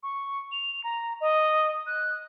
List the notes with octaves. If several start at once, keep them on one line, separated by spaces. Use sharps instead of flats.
C#6
F7
A#5
D#5
F#6